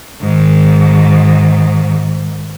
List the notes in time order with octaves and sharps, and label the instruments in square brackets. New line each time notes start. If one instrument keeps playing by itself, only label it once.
[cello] G#2 D#3